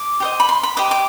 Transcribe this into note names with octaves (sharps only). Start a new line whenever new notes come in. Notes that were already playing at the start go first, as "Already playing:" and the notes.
Already playing: D6
G4 C5 D#5
B5
C6
B5
G4 C5 D#5 D6
D6